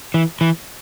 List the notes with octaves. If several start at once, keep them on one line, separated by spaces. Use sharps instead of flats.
E3
E3